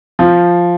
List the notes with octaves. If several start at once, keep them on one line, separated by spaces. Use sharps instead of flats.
F3